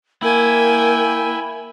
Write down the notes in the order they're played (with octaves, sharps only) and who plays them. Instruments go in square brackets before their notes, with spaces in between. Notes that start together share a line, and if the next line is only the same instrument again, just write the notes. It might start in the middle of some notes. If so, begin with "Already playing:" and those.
[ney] A#3 [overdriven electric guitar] E4 [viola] G5 G#5